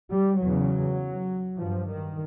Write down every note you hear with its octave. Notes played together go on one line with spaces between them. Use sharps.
G3
E2 C#3 F#3
G2 F3
D#3